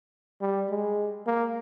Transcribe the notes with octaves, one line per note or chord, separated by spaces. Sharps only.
G3
G#3
A#3